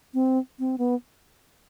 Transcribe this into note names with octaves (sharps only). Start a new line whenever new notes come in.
C4
C4
B3